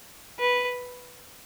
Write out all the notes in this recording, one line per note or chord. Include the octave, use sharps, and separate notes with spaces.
B4